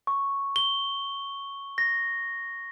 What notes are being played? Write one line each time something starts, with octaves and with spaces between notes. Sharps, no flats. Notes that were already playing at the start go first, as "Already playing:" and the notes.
C#6
G7
A#6